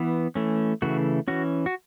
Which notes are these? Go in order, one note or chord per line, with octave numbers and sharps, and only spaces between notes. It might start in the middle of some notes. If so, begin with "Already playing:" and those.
Already playing: E3 B3
E3 A3 C#4
C#3 E3 A3 F#4
E3 C#4 F#4
F#4